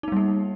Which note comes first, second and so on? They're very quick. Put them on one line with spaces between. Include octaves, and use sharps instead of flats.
D#4 B3 G3 A#3